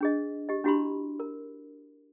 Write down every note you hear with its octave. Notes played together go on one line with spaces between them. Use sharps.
D4 G#4 D#5
G4 D#5
D4 E4 F#4 G4 B5 C6
A#4